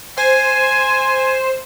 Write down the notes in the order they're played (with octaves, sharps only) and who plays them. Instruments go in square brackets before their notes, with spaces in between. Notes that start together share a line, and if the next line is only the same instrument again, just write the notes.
[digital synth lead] C5 [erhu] G#5